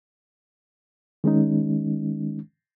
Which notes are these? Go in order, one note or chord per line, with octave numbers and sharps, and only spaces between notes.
D#3 G#3 C#4 D#4